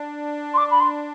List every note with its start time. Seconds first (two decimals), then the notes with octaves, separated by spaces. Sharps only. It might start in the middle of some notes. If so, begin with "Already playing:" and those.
Already playing: D4
0.53 C6
0.57 D6
0.70 B5
0.80 C6